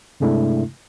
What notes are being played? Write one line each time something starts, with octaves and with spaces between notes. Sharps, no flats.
G2 C3 G#3 A3 D4 E4